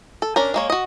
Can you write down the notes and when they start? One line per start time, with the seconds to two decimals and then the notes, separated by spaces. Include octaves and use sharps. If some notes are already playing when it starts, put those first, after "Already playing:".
0.22 A4
0.36 C#4 D4 A#4
0.54 G#3 A#3 C#5
0.70 F#4 D#5